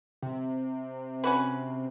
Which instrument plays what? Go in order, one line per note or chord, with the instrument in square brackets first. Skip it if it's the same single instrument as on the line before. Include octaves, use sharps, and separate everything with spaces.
[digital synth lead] C3
[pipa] C#4 F#4 B4